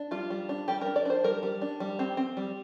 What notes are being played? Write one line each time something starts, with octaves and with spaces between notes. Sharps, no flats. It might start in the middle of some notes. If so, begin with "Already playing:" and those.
Already playing: D4
G3 F4
G3
D4
G3 G4
A#4
D4
D5
D4 C5
G3 A#4
G3
D4
G3
C4
C4
G3